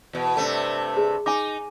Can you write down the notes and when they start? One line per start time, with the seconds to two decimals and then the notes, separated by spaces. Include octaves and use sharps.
0.13 E2 B2
0.37 G2 C3 A3
0.97 G#4
1.26 D#4 G#5 D6